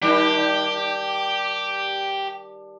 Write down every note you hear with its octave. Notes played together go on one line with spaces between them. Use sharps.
D#3 G3 D4 G4